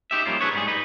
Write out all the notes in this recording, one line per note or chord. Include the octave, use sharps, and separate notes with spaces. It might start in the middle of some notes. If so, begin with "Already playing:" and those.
D#4 G4 E5
F3 G3 A#3 C#4 F4
D4 G#4 B4 C#5
G#2 G3 G#4
D#4 B4